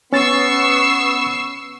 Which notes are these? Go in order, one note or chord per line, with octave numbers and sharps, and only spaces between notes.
B3 C#4 C#6 E6 A6 C7